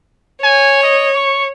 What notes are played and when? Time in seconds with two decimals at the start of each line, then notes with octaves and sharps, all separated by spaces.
0.43 C#5 G#5
0.83 D#5
1.15 C#6